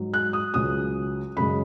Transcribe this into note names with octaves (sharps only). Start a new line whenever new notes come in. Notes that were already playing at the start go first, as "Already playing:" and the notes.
Already playing: G#2 F#3
F#6
D#6
C#2 C#3 F#3 D#6
F#2 C#3 G#3 B5